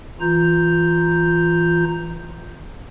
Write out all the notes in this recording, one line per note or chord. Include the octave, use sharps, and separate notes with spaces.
E3 F4 A#5 G6